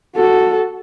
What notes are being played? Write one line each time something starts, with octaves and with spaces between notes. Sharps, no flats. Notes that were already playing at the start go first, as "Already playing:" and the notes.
F#4 A4